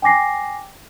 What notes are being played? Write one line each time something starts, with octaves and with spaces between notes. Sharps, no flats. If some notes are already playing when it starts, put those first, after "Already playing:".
G5 G#5 D6 A#6 C7